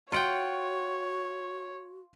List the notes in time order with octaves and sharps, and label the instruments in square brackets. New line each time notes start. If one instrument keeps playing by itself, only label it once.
[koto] F4 F#5 G5 [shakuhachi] F#4 [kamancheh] C#5 [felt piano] C6 D7